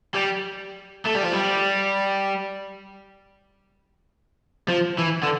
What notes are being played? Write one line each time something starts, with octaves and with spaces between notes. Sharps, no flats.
G3
A3
G3
F3
G3
F3
E3
D3